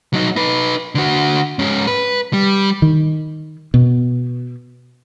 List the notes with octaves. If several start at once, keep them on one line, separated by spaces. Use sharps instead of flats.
F#3 D#4
D#4 B4
D3 F#4
G#2 C#4
B4
G3
D#3
B2